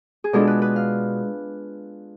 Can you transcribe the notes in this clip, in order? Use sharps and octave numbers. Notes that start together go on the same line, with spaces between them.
G#4
B2 G#3 D4 F4 A4
B4
B4
F5